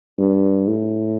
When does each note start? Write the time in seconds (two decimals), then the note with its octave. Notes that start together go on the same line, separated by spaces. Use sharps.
0.19 G2
0.68 A2